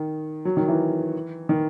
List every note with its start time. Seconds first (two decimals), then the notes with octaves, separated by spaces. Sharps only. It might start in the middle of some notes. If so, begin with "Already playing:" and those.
Already playing: D#3
0.45 F#3
0.57 D#3
0.68 E3
1.49 D#3